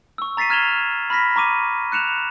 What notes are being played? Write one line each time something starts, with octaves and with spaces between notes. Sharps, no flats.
C#6 E6
A#5 A6 B6 C7 D#7
A#5 F6 G#6 E7 F7 G7
B5 F6 A#6 B6
A#5 C#6 D6 D#7
F#6 C#7 E7 F7